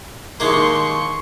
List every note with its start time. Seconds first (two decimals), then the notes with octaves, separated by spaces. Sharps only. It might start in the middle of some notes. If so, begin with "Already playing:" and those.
0.40 D#2 G#3 A#3 C6 C#6